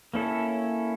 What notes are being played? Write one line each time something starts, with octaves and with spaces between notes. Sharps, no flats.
A#3 C#4 E4 A4